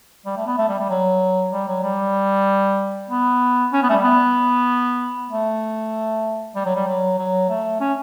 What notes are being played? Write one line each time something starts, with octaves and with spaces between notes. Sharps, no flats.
G3
A3
B3
A3
G3
G3
F#3
G3
F#3
G3
B3
C#4
B3
A3
G3
B3
A3
G3
F#3
G3
F#3
F#3
A3
C#4